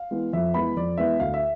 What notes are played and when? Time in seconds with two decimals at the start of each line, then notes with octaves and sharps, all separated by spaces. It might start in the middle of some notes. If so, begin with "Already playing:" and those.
Already playing: F5
0.11 E3 G#3 B3
0.33 F2 E5
0.54 E3 G#3 B3 B5
0.76 F2 D5
0.98 E3 G#3 B3 E5
1.19 D2 F5
1.34 E5